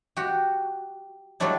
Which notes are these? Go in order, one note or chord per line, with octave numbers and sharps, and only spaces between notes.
F#4 G4
F#3 G3 A3 D4 E4